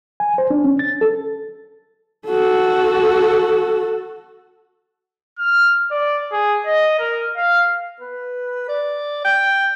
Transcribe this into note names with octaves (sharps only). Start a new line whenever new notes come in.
G#5
C5
D4
C#4
A6
A4
F#4 A4
F6
D5
G#4
D#5
A#4
F5
B4
D5
G5